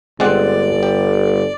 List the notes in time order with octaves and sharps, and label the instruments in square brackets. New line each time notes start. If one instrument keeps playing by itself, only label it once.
[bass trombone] G1 [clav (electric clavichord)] G#3 C4 F#5 [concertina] D5
[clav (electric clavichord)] G4